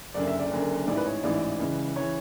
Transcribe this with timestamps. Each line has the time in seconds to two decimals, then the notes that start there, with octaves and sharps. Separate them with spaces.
0.14 F#1 F#2 D3 D5
0.27 E5
0.39 D5
0.51 F#1 F#2 D3
0.87 A1 G#2 E3 D5
0.97 B4
1.06 C#5
1.23 A1 G#2 E3 D5
1.59 C#2 C#3 E3
1.96 C#3 E3 C#5